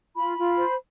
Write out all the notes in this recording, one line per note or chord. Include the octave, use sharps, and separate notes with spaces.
F4 B5
F4
C5